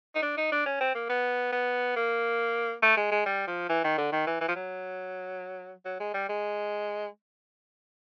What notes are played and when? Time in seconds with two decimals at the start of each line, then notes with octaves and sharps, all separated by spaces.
0.15 D#4
0.22 D4
0.37 D#4
0.52 D4
0.66 C#4
0.81 C4
0.95 A#3
1.09 B3
1.52 B3
1.96 A#3
2.82 A3
2.97 G#3
3.11 G#3
3.26 G3
3.48 F3
3.69 E3
3.84 D#3
3.98 D3
4.12 D#3
4.27 E3
4.41 E3
4.48 F3
4.55 F#3
5.85 F#3
6.00 G#3
6.14 G3
6.29 G#3